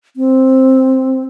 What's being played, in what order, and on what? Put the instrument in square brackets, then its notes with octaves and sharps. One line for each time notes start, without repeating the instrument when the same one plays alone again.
[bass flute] C4